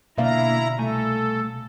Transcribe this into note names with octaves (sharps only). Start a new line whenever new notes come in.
B2 D3 A#3 E4 D5 E5 F5 A#5
C2 A3 A4 G#5